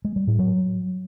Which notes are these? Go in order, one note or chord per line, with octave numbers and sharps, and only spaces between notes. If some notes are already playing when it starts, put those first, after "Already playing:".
G#3
G3
A2
F#3